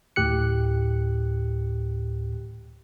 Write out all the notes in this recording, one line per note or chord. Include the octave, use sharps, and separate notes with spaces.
D2 A2 G4 F#6 C#7